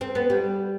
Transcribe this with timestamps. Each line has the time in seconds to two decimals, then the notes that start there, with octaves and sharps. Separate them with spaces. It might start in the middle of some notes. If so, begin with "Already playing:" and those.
0.01 C4
0.15 B3
0.30 G3